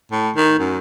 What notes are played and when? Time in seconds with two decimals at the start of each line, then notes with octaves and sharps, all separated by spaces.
0.12 A2
0.36 D#3
0.59 F#2